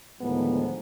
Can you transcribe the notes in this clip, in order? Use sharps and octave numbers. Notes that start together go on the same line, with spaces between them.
D2 A2 D#3 F3 G#3 B3